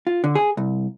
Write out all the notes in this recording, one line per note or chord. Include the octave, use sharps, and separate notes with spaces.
F4
D3
G#4
C2